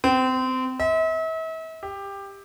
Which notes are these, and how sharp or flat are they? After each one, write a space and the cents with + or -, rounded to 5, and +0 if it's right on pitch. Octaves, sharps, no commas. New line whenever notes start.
C4 -25
E5 -40
G4 +15